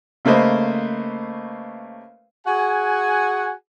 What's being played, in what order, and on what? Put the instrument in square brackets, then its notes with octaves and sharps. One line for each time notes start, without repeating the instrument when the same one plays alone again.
[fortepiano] C#3 A3 A#3 B4 C5 D#5
[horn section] F#4 G#4 F#5 G#5